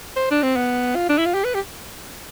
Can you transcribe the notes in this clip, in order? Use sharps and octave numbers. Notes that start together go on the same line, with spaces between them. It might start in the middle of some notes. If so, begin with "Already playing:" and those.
C5
D4
C4
B3
F4
D4
E4
F4
G4
B4
G4